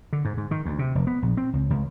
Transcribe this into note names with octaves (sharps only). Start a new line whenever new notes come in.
D3
G#2
G#2
D#3
D2
C3
F1
B3
A#1
C4
C#2
C#2